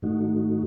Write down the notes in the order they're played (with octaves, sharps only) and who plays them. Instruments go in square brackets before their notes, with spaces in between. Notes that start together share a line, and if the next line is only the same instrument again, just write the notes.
[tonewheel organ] G#2 D#3 A3 D#4 F#4